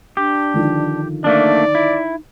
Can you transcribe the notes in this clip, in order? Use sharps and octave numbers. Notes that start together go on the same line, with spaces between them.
D4 G4
D3 D#3 F3
A3 A#3 D4 D#4 D5
E4